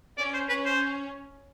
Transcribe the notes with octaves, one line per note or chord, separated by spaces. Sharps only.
C#4 D5
C5
C#4 B4
C5